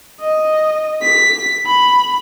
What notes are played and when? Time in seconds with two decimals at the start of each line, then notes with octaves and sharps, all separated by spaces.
0.20 D#5
1.02 B6
1.66 B5